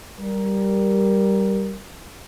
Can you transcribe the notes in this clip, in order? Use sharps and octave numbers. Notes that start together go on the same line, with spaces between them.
G3 A#4